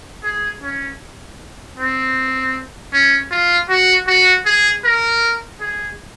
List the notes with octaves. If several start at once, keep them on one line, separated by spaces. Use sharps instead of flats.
G#4
C#4
C4
C#4
F4
F#4
F#4
G#4
A#4
G#4